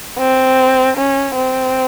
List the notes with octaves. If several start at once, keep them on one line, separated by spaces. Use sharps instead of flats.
C4
C#4
C4